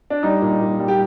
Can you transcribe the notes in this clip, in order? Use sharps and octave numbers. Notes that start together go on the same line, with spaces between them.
D4
G3 D#4
A#2
A#2
G3
G4